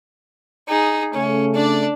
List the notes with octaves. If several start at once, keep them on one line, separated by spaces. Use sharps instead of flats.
D#4 G#4
C#3 A3 C#4
D4 D5